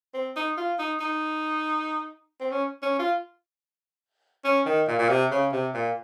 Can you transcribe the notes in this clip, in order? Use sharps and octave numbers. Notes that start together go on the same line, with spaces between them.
C4
D#4
F4
D#4
D#4
C4
C#4
C#4
F4
C#4
D#3
A#2
A#2
C3
C#3
C3
A#2